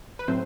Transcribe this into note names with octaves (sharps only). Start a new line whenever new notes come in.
B4
A2 F#3 A3 C4 C5